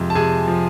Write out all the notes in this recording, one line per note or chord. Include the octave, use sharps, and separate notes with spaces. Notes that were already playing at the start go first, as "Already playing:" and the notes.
Already playing: F2 C3 G#3
A5
C3 G#4 G#5
F3